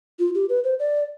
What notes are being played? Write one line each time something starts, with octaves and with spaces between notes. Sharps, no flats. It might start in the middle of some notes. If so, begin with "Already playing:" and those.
F4
G4
B4
C5
D5